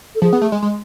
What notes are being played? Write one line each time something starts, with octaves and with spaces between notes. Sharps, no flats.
A4
F3 G#4
B3
A3
G#3
G#3